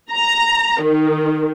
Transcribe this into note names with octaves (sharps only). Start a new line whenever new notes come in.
A#5
D#3